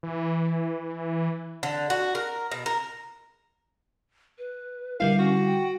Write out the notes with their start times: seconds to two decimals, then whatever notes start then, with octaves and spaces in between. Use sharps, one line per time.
0.03 E3
1.63 D3
1.90 F#4
2.15 A#4
2.51 B2
2.66 A#4
4.38 B4
5.00 D3 G3 E4 A#4 F5
5.19 C#4 F#4
5.46 G5